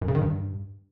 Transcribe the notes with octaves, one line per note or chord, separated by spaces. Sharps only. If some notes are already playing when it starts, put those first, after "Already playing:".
F#2
C#3
D#3
G2